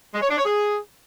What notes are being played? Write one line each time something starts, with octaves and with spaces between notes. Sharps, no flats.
G#3
C#5
D4
C#5
G#4